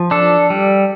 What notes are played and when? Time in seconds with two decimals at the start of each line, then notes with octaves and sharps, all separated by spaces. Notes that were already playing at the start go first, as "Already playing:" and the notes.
Already playing: F3
0.11 D4 A4
0.50 G3